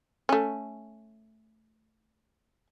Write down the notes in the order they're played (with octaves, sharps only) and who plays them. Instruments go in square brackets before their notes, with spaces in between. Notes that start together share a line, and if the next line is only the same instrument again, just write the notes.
[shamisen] A3 C#4